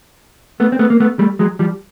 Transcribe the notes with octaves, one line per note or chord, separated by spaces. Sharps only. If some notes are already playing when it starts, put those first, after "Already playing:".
A3 B3
C4
A3 B3
A#3
A3 B3
G3 A3
F#3 G#3
F3 G3